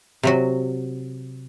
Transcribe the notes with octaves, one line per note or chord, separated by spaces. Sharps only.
C3 F#3 F#4